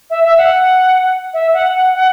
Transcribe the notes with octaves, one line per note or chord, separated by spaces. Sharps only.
E5
E5
F#5
E5
F#5
F#5
F#5